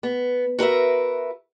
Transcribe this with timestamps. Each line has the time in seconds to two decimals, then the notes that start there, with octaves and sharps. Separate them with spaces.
0.03 B3
0.59 F#4 A#4 B4 E5